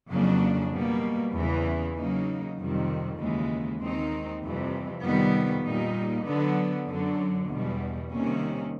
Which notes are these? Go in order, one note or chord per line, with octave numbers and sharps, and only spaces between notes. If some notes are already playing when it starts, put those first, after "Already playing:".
F2 C#3 F#3 A#3 D4
B2 G3 A#3
E2 C#3 E3
C#3 F#3 A#3 D#4
F2 C3 D#3 G3
D#2 C#3 E3 G#3
D#2 D#3 G#3 C4 D#4
F2 C3 E3 G3
F2 C3 D#3 G3 B3
A#2 G3 A#3 D#4
D3 F#3 B3
F#2 D3 F#3
E2 B2 G3
C3 D#3 G3 A#3 C#4